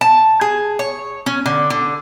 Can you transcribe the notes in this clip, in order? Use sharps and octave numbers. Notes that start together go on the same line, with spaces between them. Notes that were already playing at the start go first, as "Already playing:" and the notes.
A5
G#4
C#5
C#4
D3
D3